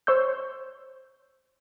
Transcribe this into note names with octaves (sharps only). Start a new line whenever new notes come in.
C5 C#5 E6 G6